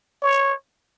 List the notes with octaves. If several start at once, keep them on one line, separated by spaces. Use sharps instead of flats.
C#5